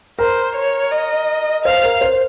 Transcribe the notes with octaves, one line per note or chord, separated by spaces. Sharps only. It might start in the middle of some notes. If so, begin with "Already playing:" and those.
A#4 C5
C#5
D#5
C5 F5
A#4
C5